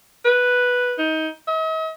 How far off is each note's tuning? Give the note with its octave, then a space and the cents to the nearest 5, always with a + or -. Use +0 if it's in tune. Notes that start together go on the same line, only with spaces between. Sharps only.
B4 -5
D#4 +25
D#5 +45